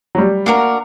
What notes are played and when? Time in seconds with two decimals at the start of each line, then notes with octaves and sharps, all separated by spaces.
0.15 F#3
0.18 G3
0.46 A#3 D4 F#4 A#4